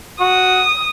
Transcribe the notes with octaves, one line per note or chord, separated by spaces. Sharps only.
F#4 D#6